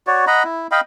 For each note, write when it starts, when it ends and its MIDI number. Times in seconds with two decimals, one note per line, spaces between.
0.07 0.25 66
0.07 0.25 73
0.07 0.25 74
0.27 0.43 75
0.27 0.43 78
0.27 0.43 82
0.27 0.43 83
0.44 0.67 64
0.71 0.81 75
0.71 0.81 77
0.71 0.81 79
0.71 0.81 83